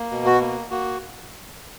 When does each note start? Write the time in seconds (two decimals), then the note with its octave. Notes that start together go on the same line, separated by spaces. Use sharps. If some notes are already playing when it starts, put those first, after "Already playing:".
Already playing: A#3
0.11 B2
0.26 F#4
0.41 A#3
0.71 A#3 F#4